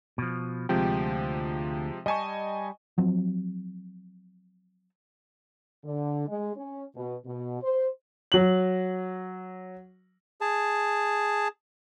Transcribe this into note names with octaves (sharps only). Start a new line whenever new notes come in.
B2 F3
D2 C3 F3 G#3 G5
G3 D#5 G#5 A5 C#6
F3 F#3 C4
D3
G#3
C#4
B2
B2
C5
F#3 F#7
G#4 A5